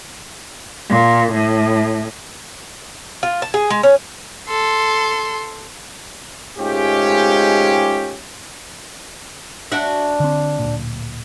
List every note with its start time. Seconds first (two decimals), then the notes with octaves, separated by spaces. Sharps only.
0.89 A#2
1.32 A2
3.23 F4
3.42 A5
3.54 G#4
3.70 G#3
3.83 C#4
4.48 A4 C6
6.58 G#2 G#3 A3 C#4 F4 G4
9.71 D4 F#4 E5
10.20 D3 C4
10.59 D1 A#2